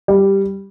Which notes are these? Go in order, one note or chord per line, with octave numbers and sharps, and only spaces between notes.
G3